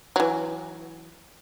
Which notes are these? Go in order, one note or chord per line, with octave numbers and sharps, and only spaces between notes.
E3 F#3